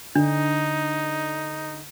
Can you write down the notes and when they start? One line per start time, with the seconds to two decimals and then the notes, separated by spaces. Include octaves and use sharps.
0.15 D3 D4 D#4